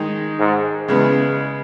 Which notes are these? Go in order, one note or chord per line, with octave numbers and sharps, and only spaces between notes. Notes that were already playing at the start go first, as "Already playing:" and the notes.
Already playing: D#3 G#3 D#4
G#2
E2 C#3 G#3 B3